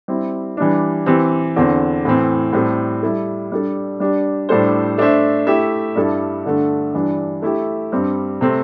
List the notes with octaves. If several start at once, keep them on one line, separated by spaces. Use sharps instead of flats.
G3 C4 E4
E3 G3 D4
E3 C4 G4
E2 D3 C4
A2 E3 C4
A2 G3 C4 A4
G3 E4 A4
G3 D4 A4
G3 D4 G4
A2 G3 D4 A4 C5
A3 D4 C5 E5
A3 E4 G4 E5
G2 G3 E4 A4
G2 D3 A3
G2 E3 G3 D4
A3 E4 G4
G2 G3 C4
C3 A3 C4